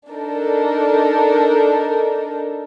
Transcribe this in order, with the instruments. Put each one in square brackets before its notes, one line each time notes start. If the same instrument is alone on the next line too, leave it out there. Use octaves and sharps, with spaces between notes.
[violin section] D4 D#4 A4 A#4